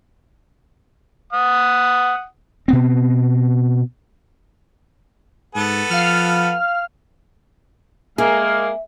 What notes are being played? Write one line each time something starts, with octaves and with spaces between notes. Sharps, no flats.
F#5 D#6
B2 B3 C4
G#2 B3 A4
F3 F5 F6
G#3 A#3 G#4 E5 F6